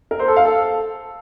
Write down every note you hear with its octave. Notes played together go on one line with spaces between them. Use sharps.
A#4
C5
A4
F5
A4